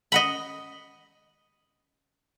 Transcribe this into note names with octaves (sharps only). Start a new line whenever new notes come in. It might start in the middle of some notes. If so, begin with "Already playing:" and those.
D#5 F#5 B5